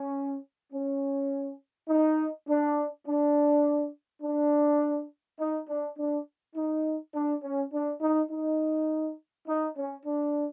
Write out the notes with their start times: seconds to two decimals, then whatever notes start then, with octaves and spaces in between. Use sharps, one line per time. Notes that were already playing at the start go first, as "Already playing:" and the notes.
Already playing: C#4
0.72 C#4
1.88 D#4
2.47 D4
3.05 D4
4.22 D4
5.39 D#4
5.68 D4
5.97 D4
6.55 D#4
7.13 D4
7.42 C#4
7.72 D4
8.00 D#4
8.30 D#4
9.47 D#4
9.76 C#4
10.05 D4